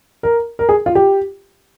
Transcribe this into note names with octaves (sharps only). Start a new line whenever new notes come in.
A#4
A#4
G#4
F4
G4